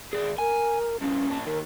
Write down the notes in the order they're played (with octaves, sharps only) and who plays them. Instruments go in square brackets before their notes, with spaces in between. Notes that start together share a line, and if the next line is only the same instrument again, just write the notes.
[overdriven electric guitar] D#3 G#4 [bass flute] D5
[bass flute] A#4 [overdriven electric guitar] G#5
[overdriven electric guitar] G2 C#3 [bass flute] C#4
[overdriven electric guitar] A#2 A5
[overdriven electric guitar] D#2 D#3 [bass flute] A#4